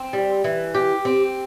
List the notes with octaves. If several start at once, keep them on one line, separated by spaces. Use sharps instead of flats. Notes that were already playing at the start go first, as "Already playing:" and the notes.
Already playing: C4
G3
E3
G4
C4